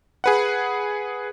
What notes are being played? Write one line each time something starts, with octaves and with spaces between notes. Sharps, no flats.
G#4 B4 F#5